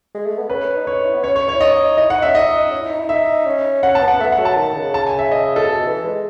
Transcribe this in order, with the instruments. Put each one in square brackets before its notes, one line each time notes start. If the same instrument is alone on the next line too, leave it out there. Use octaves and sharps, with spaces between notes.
[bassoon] G#3
A3
B3
[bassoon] C#4 [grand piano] B4
[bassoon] D#4
[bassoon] C#4 [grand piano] C#5
[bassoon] E4
B3
[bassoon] C#4 [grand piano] C#5
[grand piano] C#5
C#5
[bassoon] E4
[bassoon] D#4 [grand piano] D#5
[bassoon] E4 [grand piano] D#5
[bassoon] D#4 [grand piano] F#5
[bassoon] C#4 [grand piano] E5
[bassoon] D#4 [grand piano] D#5
[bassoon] C#4
E4
D#4
E4
[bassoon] D#4 [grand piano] E5
[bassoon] C#4
[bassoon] C#4 [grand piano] F#5
[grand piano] A5
[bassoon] B3
[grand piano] F#5
[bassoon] A3 [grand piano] E5
[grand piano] F#5
[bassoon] F#3
[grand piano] A5
[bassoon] D#3
C#3
[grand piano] A5
G#5
E5
D#5
A4
[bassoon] B2
E3
G#3